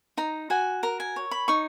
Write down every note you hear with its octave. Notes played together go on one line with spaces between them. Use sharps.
D#4 A#5
F#4 G#5
A#4 A#5
G#5
C#5
B5
D#4 C#6